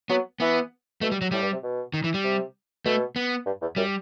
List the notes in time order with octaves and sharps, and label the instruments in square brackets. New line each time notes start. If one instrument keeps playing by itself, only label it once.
[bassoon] F#3 [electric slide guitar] B3
[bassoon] E3 [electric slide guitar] B3
[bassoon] B2 [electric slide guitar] A3
[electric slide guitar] G3
F#3
[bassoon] A2 [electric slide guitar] G3
[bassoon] G2
C3
B2
[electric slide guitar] D#3
E3
G3
[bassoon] C3
[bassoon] B2 [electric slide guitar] A3
[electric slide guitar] B3
[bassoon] G2
E2
[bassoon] F#2 [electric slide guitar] G3